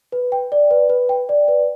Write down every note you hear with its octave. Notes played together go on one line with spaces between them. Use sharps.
B4
G5
D5
B4
B4
G5
D5
B4